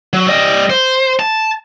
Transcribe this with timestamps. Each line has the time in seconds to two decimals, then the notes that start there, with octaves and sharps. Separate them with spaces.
0.13 F#3
0.27 G3 D#5
0.70 C5
1.20 A5